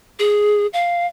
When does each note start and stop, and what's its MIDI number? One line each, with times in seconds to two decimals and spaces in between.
0.19 0.67 68
0.73 1.06 77